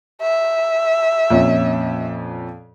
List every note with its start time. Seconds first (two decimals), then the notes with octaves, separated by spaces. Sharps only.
0.21 E5
1.30 F2 A#2 C#4